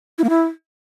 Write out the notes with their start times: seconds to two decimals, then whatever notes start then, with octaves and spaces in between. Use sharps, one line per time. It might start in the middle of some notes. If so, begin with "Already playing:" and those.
0.18 E4
0.24 A#3
0.29 E4